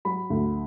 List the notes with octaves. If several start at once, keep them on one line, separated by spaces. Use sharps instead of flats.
F#3 B5
D2